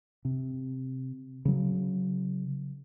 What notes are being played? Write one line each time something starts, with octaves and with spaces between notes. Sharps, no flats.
C3
C#3 F#3